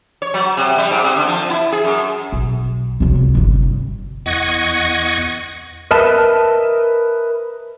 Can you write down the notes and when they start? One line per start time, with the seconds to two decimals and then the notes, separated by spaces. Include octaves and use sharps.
0.22 C#5
0.34 F#3
0.57 C3
0.78 G3
0.90 G#2
1.04 C3
1.16 D3
1.27 F3
1.50 E4
1.72 G#4
1.84 F#2
2.32 B1
3.00 C3 F#3
3.15 C#2
3.35 G1 D3
4.26 E2 D#5 F#5 C#6 G#6 A#6
5.91 A#4 B4 D#5 E5 A5